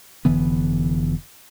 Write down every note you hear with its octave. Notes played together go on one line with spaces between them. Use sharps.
F1 D3 E3 B3